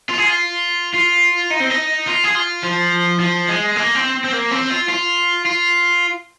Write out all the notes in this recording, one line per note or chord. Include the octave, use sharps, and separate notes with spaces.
F4
G#4
F4
F4
D#4
C4
D#4
F4
G#4
F4
F3
F3
G#3
A#3
C4
C4
A#3
C4
F4
F4
F4